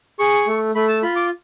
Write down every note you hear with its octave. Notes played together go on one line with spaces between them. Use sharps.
G#4 C#6
A3
A3 B5
A5
F4 B5
D6